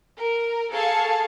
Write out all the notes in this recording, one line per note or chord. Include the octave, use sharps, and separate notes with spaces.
A#4
G#4 A4 F5 A5 C#6